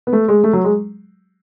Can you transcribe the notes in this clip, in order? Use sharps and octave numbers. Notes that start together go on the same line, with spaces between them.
B3
A3
G#3
A3
F#3
G#3